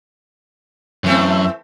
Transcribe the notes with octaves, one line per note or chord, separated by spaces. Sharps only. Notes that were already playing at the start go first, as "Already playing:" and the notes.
F#2 E3 A3 C4